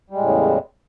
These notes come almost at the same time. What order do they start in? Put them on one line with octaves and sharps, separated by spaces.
G3 G#3 A2 C#3 E2